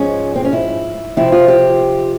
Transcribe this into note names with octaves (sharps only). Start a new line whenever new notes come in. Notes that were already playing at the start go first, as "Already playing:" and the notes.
Already playing: G#2 F3 G#3 C#4
C4
C#4
E4
F2 C3 F3 C4 E4
F4
G4